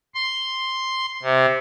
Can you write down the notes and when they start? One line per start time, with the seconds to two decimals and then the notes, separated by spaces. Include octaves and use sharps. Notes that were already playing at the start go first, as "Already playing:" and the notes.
0.14 C6
1.23 C3